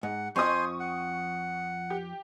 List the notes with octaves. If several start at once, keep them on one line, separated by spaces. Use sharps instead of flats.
G#2 F#5
F2 F3 C5 D#5 G#5 C6 C#6 D#6
F#5
G4